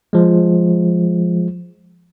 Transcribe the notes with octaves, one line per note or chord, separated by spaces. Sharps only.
F3 G#3